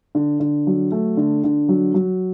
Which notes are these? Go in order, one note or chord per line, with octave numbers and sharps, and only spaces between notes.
D3
D3
F#3
A3
D3
D3
F#3
F#3